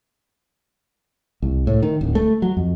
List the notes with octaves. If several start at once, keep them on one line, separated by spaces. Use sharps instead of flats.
C2
A2
D#3
D1
A3
F#3
F2